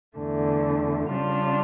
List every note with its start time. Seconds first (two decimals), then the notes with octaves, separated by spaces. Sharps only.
0.18 E2 D3 A3
1.12 C#3 G3 D4 F4